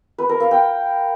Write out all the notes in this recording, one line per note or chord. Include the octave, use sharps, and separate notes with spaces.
B4
A#4
F5
G5